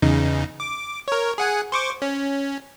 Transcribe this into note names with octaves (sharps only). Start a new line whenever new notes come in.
E2 C#3 D#4
D6
A#4 C#5
G#4 F#5 G#5
C5 C#6 D6
C#4